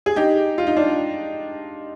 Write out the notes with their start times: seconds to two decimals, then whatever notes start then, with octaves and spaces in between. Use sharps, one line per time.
0.06 G#4
0.16 D#4 G4
0.58 F4
0.67 D#4
0.76 D4 F4